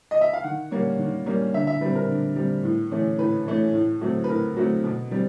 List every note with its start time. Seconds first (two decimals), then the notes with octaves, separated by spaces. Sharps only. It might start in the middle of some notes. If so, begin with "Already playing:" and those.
0.11 D#5
0.21 E5
0.33 F5
0.44 D#3 F#5
0.71 G3 A#3 C#4
0.99 D#3
1.26 G3 A#3 C#4
1.54 D3 E5
1.67 E5
1.81 G3 C4 B4
1.95 A#4
2.09 D3
2.36 G3 C4
2.63 A2
2.91 E3 A3 C#4
3.18 A2 B4
3.46 E3 A3 C#4
3.74 A2
4.01 F#3 A3 C4
4.24 B4
4.28 A2 A#4
4.57 F#3 A3 C4
4.84 B2
5.11 G3 C4